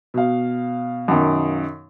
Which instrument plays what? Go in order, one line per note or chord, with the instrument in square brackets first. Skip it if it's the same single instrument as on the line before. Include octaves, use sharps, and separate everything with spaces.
[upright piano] B2 F5
[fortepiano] F#2 D#3